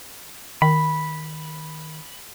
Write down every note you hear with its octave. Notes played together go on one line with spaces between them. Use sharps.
D#3 B5